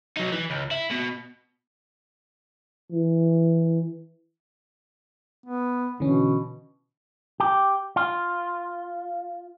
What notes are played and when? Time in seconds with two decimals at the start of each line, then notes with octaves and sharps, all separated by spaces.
0.17 F#3 D#4
0.32 E3
0.50 C#2
0.71 E4
0.91 B2
2.92 E3
5.46 B3
6.00 B2 D3 E3 C#4
7.40 G4
7.96 F4